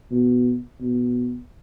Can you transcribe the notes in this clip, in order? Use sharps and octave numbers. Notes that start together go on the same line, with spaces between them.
B2
B2